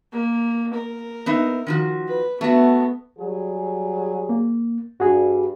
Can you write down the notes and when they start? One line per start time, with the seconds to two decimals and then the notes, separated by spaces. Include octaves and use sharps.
0.12 A#3
0.74 A#4
1.26 B3 D#4 E5
1.67 D#3 F3 F#4
2.08 B4
2.41 A3 B3 F#4
3.19 F#3 G3 G#4
4.29 A#3
5.00 G2 F#4 G#4